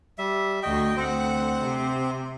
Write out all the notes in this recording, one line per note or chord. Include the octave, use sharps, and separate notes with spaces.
G3 E5
D2 F#4 D#5 G5
D2 C4 C5 F#5
C3